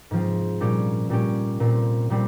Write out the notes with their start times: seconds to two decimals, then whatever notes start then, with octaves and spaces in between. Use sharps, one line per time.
0.11 G#2 F3 C4
0.60 A#2 G3 C#4 G4
1.10 A#2 G3 C#4 G4
1.60 A#2 G3 C4
2.10 A#2 G3 C4